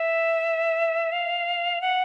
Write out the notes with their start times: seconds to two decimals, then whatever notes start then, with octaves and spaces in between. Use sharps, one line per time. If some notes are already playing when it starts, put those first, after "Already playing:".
Already playing: E5
1.12 F5
1.81 F#5